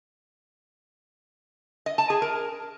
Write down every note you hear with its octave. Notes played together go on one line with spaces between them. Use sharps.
D#5
A5
G#4
A#4